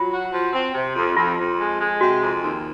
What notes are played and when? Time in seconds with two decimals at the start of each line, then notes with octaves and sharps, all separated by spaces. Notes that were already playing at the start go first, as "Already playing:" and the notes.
Already playing: F#3 F4
0.11 F#4
0.33 F3
0.53 C4
0.74 C3
0.96 F2
1.16 F2 F4
1.37 F2
1.58 G#3
1.80 G#3
2.00 C3 F#4
2.22 F2
2.42 D#2